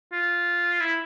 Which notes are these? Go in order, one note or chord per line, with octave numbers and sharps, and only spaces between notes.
F4
E4